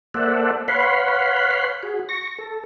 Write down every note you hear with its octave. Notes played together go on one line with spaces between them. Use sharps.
A#3 A4 C5 D5 E5 F#5
B4 C#5 F5 F#5 B5 C6
F#4 G#4
C#6 A#6
A4